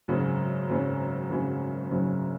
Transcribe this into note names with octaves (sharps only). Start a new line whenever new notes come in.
G#1 F#2 C#3 F#3 C#4
G#1 F#2 C#3 F#3 C#4
G#1 F#2 C#3 F#3 C#4
G#1 F#2 C#3 F#3 C#4